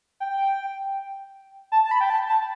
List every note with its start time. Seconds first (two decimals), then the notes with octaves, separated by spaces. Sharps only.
0.20 G5
1.72 A5
1.85 A5
1.91 B5
2.01 G5
2.10 A5
2.29 A5